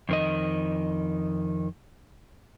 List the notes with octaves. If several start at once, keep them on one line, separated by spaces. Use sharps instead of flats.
F2 D#3 D#5